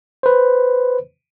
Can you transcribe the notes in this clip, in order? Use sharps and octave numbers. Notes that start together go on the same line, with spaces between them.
B4 C5